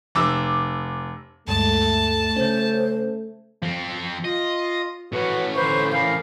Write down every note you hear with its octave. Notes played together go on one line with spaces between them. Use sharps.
F1 D6 E6
D2 G2 G#3 A3 A5
C#3 C#4 C5
F3 C4
F4 D#5
A2 C#4 F#4 B4
G#2 D3 B4 C5 C#6
C#3 E3 F3 A#4 F5 B5